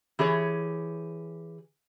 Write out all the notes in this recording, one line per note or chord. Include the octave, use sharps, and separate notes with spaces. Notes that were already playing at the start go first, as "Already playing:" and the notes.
E3 G4 G#4 C#5